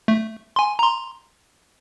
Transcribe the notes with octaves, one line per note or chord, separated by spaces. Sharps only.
A3
G#5 C6
A#5 C6